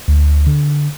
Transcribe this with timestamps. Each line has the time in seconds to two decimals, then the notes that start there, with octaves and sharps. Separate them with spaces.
0.08 D2
0.47 D3